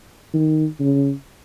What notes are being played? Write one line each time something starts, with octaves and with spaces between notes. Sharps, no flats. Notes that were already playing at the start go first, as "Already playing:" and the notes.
D#3
C#3